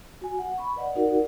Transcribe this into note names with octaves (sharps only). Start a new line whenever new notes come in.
F#4 G#5
F#5
B5 C#6
B4 D5 D#5 F#5
D#4 F#4 A#4 D5 F#5